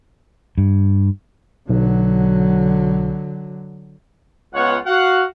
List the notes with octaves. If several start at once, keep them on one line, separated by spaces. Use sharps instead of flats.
G2
B1 D3 F#3
C#2 B3 F4 C#5 F#5
F#4 F5 F#5